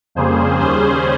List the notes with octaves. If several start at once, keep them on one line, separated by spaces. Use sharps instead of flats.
F2 C#3 G3 A#3 G#4 C5
D#2 C#3 G3 C#4 G#4 C5